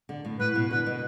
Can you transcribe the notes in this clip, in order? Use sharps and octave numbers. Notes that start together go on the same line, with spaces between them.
D3
A2
A2 B4
B2
D3 B4
B2